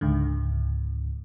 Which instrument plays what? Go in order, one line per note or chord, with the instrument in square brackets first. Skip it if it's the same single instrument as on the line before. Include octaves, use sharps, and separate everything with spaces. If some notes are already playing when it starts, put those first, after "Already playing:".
[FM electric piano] C#2 G#2 D3